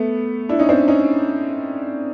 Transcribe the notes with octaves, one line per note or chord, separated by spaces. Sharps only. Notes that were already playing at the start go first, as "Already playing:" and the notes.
Already playing: A3 B3
D4 E4
C#4 D#4
C4 D4
C#4 D#4